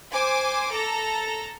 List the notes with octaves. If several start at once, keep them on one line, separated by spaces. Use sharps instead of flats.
C5 G#5 D6
A4 A#5